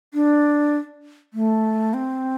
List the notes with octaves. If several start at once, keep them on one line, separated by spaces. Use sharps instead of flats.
D4
A3
C4